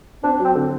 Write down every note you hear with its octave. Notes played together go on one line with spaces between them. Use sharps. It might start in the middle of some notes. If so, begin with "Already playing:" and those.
C4 D4
F#3
C4
D3